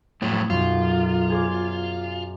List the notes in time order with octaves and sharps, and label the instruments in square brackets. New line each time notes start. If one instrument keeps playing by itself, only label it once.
[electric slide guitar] F2 A2 F#3
[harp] B1 F#2 [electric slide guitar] F4
[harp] G#4 C5 D5